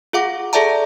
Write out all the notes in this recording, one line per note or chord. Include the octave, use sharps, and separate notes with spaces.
F4 G#4 F5 F#5 D6
G#4 A4 D5 E5 A5 A#5